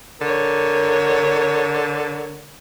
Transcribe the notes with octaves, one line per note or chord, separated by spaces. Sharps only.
D3 A#4 C#5